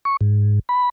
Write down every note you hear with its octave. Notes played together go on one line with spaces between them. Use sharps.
C#6
G#2
B5